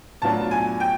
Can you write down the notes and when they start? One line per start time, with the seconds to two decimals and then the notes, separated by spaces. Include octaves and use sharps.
0.22 A2 F#3 B3 D4 F4 A5
0.51 G#5
0.80 G5